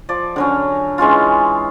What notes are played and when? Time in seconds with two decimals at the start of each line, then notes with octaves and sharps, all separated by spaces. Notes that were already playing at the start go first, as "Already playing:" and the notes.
0.09 F3 D5
0.36 D3 F#3 C#4
0.98 E3 G#3 C#4 F4